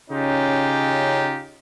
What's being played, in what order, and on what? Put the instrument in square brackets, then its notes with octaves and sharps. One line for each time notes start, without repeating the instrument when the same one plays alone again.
[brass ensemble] C#3 C#4 D#4 F4 G4